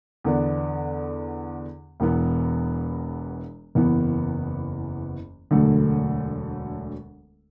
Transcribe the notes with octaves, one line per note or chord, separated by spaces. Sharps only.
E2 D3 B3 D4
E1 E2 E3 B3
F#1 E2 E3 B3
E1 D2 D3 F#3 A3